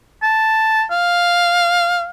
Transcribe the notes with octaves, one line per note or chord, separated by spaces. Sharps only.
A5
F5